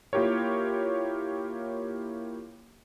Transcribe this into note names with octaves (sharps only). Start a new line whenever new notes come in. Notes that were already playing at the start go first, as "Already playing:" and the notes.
A#3 E4 F4 G4 A#4 C#5